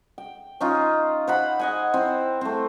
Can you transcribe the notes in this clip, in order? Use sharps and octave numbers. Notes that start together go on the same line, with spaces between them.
G5
C#4 D#4 F4
C5 F#5 B5
D#5 F#5 G#5
C4 E4
A3 C4